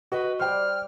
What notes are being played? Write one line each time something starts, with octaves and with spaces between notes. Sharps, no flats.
F#4 B4 D#5
G3 C5 G5 D6 F6